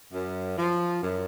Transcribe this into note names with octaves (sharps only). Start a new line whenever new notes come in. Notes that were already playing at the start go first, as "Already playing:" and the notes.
F#2
F3
F#2